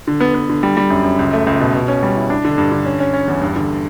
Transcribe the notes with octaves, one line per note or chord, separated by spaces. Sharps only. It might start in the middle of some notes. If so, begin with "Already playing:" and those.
D3
B3
B3
D3
G3
G3
F#2
F#2
C#2
A3
C#2
B2
B2
C#4
G3
E4
D4
D3
G2
D3
C#4
C#4
C#4
E2
G2
D3